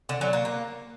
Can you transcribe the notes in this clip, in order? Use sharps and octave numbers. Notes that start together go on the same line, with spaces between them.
D3
F#3
A#3
A#3